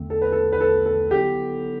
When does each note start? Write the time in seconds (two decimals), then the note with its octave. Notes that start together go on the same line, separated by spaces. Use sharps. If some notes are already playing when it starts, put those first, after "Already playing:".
Already playing: E2 D3 A3 C4
0.10 A4
0.22 B4
0.32 A4
0.52 B4
0.61 A4
0.86 A4
1.11 D3 F#3 B3 E4 G4 A4